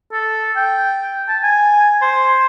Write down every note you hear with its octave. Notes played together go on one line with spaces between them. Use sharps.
A4
G5
A5
G#5
C5